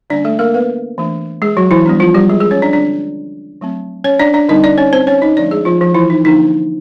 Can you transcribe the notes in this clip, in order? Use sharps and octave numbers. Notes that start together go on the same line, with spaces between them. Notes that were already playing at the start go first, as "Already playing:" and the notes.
D3 G3 A#3 C#4 D4 D5
A3 A4
A#3 A#4
B3 B4
E3 A3 D4
G#3 G#4
F#3 F#4
E3 E4
G3 B3 D4
F3 F4
G3 G4
G#3 G#4
G#3 G#4
C#4 C#5
D4 D5
D3 G3 C4 D4 D5
F#3 A3 C4
C#4 C#5
D4 D5
D4 D5
D3 G3 C4 D#4 D#5
D4 D5
C#4 C#5
C4 C5
C#4 C#5
D#4 D#5
D3 F3 A3 D4 D5
G#3 G#4
F3 F4
F3 F4
E3 E4
D#4
D3 F3 A#3 D4 D#4